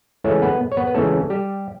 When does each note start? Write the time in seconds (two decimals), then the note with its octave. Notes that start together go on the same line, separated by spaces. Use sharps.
0.24 C#2 C#3 E3 A3 C#4
0.42 B3 B4
0.72 C#5
0.77 B3 B4
0.87 B4
0.94 C#2 C#3 E3 A3 C#4 A4
1.30 G3 G4